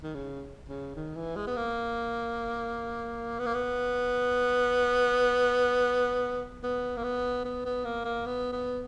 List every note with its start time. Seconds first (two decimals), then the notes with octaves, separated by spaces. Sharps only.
0.03 D#3
0.15 C#3
0.69 C#3
0.96 D#3
1.16 E3
1.36 G#3
1.47 B3
1.57 A#3
3.39 B3
3.46 A#3
3.54 B3
6.64 B3
6.97 A#3
7.04 B3
7.45 B3
7.65 B3
7.85 A#3
8.05 A#3
8.26 B3
8.53 B3